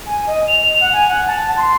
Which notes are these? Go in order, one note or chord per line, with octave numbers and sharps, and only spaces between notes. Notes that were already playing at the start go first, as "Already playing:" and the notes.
G#5
D#5
F7
F#5
G#5
F#5
A5
C6